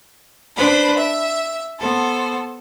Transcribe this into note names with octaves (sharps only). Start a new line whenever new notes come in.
D4 B4 C5 B5
E5
B3 A4 C5